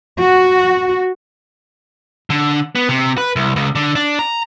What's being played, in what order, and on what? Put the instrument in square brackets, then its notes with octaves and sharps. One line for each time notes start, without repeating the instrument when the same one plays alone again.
[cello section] F#4
[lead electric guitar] D3
B3
C3
B4
C2
C#2
D3
D4
A#5